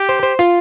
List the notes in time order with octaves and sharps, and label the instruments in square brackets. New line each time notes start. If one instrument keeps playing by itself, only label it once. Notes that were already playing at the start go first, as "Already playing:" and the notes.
Already playing: [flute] G4
[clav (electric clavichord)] C5
C5
F4